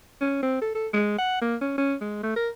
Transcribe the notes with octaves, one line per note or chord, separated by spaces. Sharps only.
C#4
C4
A4
A4
G#3
F#5
A#3
C#4
C#4
G#3
A3
A#4